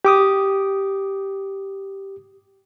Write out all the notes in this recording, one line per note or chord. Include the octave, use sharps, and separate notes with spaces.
G4 D6 D#6